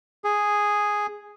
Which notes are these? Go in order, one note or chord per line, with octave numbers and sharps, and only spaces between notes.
G#4